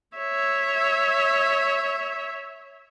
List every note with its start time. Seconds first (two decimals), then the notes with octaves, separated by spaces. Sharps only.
0.17 C#5 E5